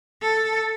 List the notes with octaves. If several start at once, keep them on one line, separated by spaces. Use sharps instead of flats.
A4